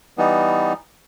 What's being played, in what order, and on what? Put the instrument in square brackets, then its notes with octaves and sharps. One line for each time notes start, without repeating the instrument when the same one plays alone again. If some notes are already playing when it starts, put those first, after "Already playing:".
[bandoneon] E3 G3 B3 D#4